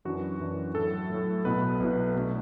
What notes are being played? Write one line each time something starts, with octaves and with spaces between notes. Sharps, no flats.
F#2 E3 D4 F#4
F#2 E3 D4
A2 F#3 A3 A4
A2 F#3 A3
B1 B2 B3 E4 B4
B1 B2 B3 E4
B2 A3 D4